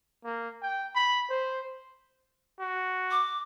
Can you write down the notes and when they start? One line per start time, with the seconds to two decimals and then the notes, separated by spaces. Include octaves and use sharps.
0.25 A#3
0.62 G5
0.95 B5
1.30 C5
2.61 F#4
3.11 D6